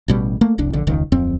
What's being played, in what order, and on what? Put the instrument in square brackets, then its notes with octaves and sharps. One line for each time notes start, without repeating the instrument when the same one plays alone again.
[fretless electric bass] A1 B2 G3
A3 A#3
F1 C2 D4
A#1 D3
E1 C#2 D#3
D1 F2 C4